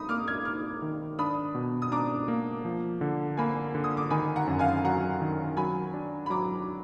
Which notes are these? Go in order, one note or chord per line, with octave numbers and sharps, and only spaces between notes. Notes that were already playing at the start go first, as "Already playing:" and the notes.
Already playing: D#4 B5 D#6
A#3 D6 F6
F6 G#6
D#4 D6 F6
D#3
D4 B5 D#6
B2
D#6
D4 A#5 D6
A#3
F3
D3
A#3 G#5 B5
D3
D#6
D6
D#3 G#5 B5
F#5 A#5
F#2
F5 G#5
F#3 F#5 A#5
D#3
F#3 G#5 B5
D4
B5
F#3 A#5 D6